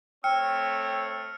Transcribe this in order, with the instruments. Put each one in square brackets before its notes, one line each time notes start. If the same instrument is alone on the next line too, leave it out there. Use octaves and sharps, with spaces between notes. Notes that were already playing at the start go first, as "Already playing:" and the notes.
[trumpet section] A3 C4 C#5 [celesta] G5 [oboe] E6 [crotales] F6 C#7